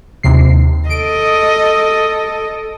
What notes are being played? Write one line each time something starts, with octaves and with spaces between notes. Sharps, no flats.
D#2 C3 C7
A4 D#5 D7